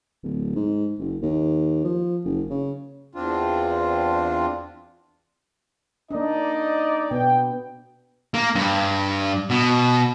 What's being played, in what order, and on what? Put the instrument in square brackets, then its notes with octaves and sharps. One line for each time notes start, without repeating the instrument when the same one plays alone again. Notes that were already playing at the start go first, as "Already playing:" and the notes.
[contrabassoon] D1
G#2
F#1
D#2
F3
F#1
C#3
[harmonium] E2 C4 D4 F4
[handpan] A#3 D4 [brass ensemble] D#4 D5 D#5
[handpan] B2 B3 [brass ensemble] G5
[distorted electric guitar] A#3
G2
B2